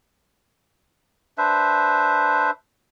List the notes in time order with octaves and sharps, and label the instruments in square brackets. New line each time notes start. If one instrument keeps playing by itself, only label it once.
[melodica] D4 B4 C5 E5